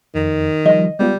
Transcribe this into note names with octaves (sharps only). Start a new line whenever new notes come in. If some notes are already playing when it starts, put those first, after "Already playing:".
F2 D#3
F3 G3 D#5
G3 G#3 B3 F4